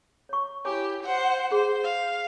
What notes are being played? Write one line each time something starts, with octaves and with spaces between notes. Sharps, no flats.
C#5 C#6
E4 G4 C#5 G#5 D6
C5 F#5
G#4 C5
F5